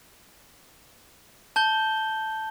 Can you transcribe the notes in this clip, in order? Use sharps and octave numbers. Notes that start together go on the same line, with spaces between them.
A5 G6 G7